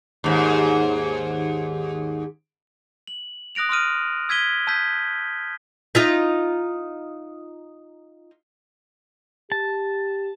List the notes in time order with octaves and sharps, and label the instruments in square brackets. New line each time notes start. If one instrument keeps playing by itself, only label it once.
[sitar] D#2 G#2
[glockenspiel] F#7
D#6 F#6 A#6 D7 F7
C6 D#6 F6 D#7
E6 G#6 B6 D#7 G7
A5 E6 G6 G#6 B6
[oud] D#4 F4 E5
[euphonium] G4 [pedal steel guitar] A5